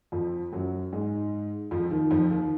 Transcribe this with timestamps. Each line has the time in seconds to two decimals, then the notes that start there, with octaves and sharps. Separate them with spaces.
0.12 F2 F3
0.52 F#2 F#3
0.92 G#2 G#3
1.71 F2 F3
1.91 D#2 D#3
2.11 F2 F3
2.31 D#2 D#3